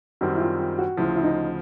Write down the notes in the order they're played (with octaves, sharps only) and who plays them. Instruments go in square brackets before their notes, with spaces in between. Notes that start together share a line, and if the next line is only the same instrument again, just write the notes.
[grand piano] F#2 D#3 G3 C4 [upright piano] F#4
[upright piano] E4
F4
F4
F#4
[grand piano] D2 C#3 F3 [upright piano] E4
[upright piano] E4
D#4